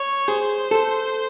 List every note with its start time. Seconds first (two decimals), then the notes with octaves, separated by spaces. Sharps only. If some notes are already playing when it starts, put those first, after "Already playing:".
Already playing: C#5
0.28 G#4 C5
0.71 A4